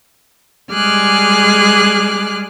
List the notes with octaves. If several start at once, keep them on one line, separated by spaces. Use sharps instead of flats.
G3 G#3 G#4 D6 F6 F#6